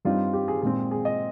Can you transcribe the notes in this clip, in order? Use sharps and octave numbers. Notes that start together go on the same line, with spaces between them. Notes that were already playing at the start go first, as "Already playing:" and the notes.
G2 G3 C4 D#4 F4
G4
G#4
A#2 G#3 C4 G#4
G#4
D#5